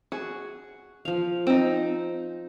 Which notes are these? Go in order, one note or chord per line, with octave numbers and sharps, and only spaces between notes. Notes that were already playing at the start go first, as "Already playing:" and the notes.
F#4 G#4
F3 F5
C4 D#4